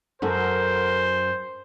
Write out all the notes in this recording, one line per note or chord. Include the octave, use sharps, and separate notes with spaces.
F#2 F#4 A4 A#4 C5